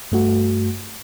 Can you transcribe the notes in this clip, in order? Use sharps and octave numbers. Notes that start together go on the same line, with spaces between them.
G2 A3 F#4